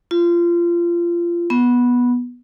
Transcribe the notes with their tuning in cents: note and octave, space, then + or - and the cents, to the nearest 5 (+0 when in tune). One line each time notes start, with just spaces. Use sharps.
F4 -25
B3 -10